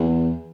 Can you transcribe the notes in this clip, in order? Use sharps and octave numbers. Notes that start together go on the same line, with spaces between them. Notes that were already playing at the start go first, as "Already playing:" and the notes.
Already playing: E2